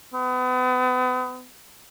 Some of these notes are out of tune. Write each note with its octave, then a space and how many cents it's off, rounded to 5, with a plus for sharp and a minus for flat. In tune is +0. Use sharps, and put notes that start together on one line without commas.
B3 +40